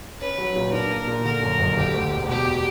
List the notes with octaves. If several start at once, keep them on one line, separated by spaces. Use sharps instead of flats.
C#4 B4
F#3
A#2
D4 A#4
A#3
A#2
D3 A#4
F#2
F#1
D3 G4
D2
E1
B2 G4